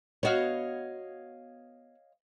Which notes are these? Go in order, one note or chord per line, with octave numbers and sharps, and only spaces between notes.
B3 F#4 C#5 D#5 F5